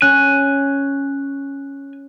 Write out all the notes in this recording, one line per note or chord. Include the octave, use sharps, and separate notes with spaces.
C#4 G#5 F#6